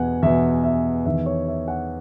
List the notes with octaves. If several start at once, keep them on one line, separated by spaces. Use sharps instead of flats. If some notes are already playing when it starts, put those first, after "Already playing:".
Already playing: E2 B2 F#5 G#5
E2 B2 E5
E5
E2 D#3 E5
C#5
E5
F#5